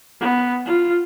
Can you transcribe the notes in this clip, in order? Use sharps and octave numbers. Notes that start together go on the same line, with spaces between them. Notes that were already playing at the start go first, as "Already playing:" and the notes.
B3
F4